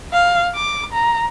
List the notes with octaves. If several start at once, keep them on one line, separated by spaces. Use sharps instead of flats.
F5
D6
A#5